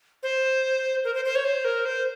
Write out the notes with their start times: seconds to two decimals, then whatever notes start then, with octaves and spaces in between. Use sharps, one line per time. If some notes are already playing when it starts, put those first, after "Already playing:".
0.23 C5
1.04 A#4
1.15 C5
1.25 C5
1.35 C#5
1.44 C5
1.65 A#4
1.85 C5